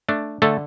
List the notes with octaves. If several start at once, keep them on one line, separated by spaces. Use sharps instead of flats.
A3 D4
D3 A3 A4